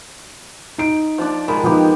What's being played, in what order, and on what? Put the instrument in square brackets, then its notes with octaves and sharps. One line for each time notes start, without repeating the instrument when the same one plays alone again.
[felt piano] D#4 D7
[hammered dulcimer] F3 D4
[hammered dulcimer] D#3 G#3 [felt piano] B5
[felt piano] F3 D#4 [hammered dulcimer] G#3 B3 G4